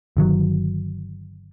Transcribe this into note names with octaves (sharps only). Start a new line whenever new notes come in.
G1 D#3 F#3